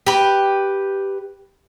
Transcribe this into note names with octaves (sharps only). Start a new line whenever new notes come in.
G4 B4